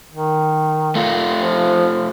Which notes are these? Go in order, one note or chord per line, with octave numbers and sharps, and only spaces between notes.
D#3
A3 F4
F3